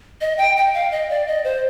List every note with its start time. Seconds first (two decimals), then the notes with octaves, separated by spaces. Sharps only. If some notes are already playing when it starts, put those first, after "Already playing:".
0.21 D#5
0.38 G5
0.57 G5
0.74 F5
0.92 D#5
1.10 D5
1.27 D#5
1.44 C5